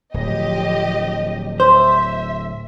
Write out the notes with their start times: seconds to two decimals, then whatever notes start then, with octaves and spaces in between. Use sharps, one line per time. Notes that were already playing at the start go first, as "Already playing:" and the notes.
0.14 D1 F3 G4 D#5
1.60 C5 E5